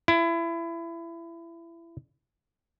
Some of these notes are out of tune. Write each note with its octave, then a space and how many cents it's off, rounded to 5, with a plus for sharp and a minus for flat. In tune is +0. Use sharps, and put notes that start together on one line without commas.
E4 +25